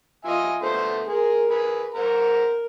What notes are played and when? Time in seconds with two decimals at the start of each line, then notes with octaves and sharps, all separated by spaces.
0.25 F4 D#5 E5 G#5
0.62 D3 A3 B3 C5
1.07 G#3 G#4 A#4
1.49 G#4 B4
1.95 A#4 C5 F#5 A#5